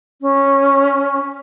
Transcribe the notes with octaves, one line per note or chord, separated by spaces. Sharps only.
C#4